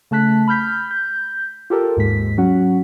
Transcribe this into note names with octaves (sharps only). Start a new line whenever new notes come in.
C#3 A3 A5 F#6 B6
B5 F6 G6 B6
G6
F4 G4 A4 A#4
D#2 G#2 G#3 B6
F#3 C#4 F#4 F#5